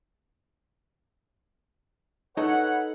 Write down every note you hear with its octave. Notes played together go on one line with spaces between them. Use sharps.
D#4 A4 B4 C#5 D#5 F#5